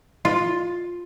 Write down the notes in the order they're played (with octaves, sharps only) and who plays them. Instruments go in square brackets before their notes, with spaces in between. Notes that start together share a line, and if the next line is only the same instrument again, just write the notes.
[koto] F4